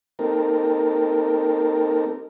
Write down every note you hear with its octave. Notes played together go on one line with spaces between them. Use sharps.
A#3 C4 D#4 G4 A4 A#4